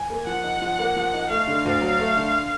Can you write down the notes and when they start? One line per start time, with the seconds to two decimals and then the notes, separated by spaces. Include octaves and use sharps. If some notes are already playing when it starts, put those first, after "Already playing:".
Already playing: G#5
0.10 A#3
0.27 F3 F#5
0.44 D#4
0.62 F3
0.79 A#3
0.96 F3
1.14 D#4
1.30 A3 F5
1.48 D3
1.65 D2
1.81 F#3
1.99 A3
2.16 D3